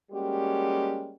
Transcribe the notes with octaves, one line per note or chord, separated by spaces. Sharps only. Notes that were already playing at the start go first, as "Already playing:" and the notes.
G3 G#3 A#3 C#4 F#4 G4